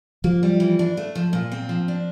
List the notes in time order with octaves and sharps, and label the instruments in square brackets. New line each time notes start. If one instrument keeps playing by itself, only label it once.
[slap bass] F3 [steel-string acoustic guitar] A#3
[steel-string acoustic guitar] G3
E3
D4
A3
F3
A#2
C4
F3
D4